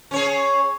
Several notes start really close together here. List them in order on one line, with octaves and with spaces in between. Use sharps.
C#4 C#5 G#4